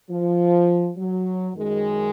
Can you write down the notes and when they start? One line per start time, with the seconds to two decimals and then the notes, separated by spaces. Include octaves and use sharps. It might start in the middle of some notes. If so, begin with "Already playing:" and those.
0.10 F3
0.97 F#3
1.55 F#2 D#3 G#3